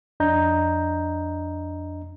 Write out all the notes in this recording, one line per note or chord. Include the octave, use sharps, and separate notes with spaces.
F2 D4 D#5 A#5 G6